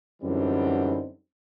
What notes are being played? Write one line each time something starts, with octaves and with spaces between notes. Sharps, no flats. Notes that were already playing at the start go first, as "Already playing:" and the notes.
F#2 D3 E3 G3 C4 D#4